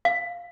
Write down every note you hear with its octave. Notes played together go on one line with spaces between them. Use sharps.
F5